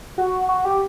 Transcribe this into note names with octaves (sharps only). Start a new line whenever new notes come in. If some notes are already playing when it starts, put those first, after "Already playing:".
F#4
F#4
G4